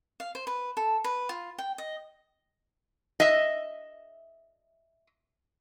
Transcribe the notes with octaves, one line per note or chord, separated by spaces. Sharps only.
F5
C5
B4
A4
B4
F4
G5
D#5
D#5 E5